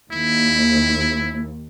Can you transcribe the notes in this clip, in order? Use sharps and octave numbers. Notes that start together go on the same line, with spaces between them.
D#2 E4